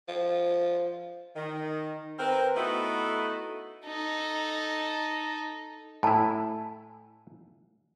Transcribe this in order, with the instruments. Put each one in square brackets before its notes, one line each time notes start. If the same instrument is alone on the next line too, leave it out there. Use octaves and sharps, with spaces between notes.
[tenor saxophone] F3
[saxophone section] D#3
C4 A#4 B4
A3 B3 D#4 E4 F#4 A4
[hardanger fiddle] D#4 A4
[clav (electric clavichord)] A2 E4 [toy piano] G#5 A5